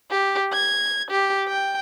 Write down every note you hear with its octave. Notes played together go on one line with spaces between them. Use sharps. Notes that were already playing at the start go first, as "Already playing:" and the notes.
G4
G#6
G4
G5